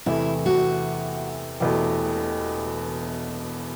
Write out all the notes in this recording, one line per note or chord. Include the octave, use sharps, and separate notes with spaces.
E2 C3 E3 A3 E4
F#4
E1 E2 B2 A3 G4